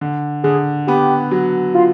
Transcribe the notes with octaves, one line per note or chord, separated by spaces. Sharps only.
D3
D3 G#4
B3 G4
F#3
F4